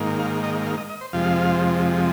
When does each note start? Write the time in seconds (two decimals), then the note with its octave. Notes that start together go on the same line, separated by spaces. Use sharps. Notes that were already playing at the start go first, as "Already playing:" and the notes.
Already playing: G#2 D#3 A#3
0.19 F5
0.43 D#5
0.66 F5
0.77 D#5
0.89 D#5
1.01 C5
1.13 F2 C3 F3 G#3 F5